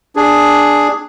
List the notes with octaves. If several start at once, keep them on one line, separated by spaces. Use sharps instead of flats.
D4 G#4